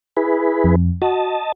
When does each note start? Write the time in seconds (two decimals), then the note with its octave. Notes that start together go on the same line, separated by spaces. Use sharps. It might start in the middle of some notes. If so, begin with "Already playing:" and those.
0.17 E4 G#4 B4
0.64 F2
1.02 F#4 D#5 A5